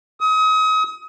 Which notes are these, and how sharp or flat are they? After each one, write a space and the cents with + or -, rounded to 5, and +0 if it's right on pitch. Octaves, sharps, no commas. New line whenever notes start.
D#6 +35